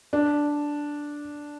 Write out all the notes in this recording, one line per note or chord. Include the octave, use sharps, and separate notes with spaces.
D4